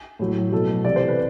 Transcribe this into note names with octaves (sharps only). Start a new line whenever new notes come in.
A2 F#3
B2 F#3 A4
C3 E3 D5
C5
B4